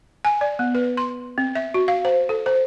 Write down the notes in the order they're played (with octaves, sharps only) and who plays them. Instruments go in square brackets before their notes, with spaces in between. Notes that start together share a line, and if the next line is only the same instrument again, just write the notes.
[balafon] G#5
D5
B3
B4
C6
C4
E5
F#4
F5
C5
A4
C5